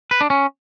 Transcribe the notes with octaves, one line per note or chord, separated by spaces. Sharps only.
B4
D4
C#4